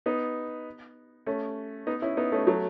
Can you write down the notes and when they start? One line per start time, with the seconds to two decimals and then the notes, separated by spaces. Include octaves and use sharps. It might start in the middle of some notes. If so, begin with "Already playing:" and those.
0.06 B3 D#4
1.26 A3 C#4
1.87 B3 D#4
2.02 C#4 E4
2.17 B3 D#4
2.32 A3 C#4
2.47 F#3 A3